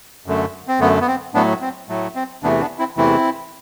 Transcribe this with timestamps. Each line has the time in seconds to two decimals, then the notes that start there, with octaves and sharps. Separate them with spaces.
0.26 F#2 D3 A3
0.68 C4
0.80 F#2 D3 A3 B3
1.01 B3
1.07 C4
1.34 A2 F#3 A3 B3 D4
1.61 C4
1.89 A2 F#3 A3
2.15 C4
2.43 E2 C3 E3 A3 B3 D4
2.61 B3 D4
2.79 C4 E4
2.97 E2 C3 E3 A3 C4 E4